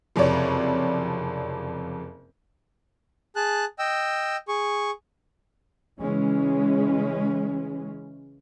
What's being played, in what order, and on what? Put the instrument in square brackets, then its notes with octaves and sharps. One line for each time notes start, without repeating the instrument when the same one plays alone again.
[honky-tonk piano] F#1 F2 C3 C#5 D5
[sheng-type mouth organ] G#4 A5 F#6
D#5 G5 E6
G#4 C#6
[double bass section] C#3 E3 G#3 C#4